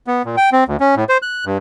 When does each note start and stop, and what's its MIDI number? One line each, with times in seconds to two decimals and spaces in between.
0.07 0.23 59
0.25 0.36 46
0.37 0.50 79
0.52 0.64 60
0.68 0.77 38
0.80 0.95 61
0.96 1.04 45
1.09 1.18 72
1.22 1.45 90
1.45 1.58 43